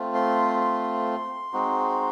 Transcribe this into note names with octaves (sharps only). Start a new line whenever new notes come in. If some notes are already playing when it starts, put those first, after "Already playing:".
Already playing: A3 C4 F4
C6
C6
G#3 C4 D#4 F#4